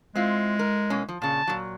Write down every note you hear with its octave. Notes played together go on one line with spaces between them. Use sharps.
G#3 C4 E4 F4
A#4
B2 A#3 C#4
F3
A#2 C#3 A5
A#2 F#3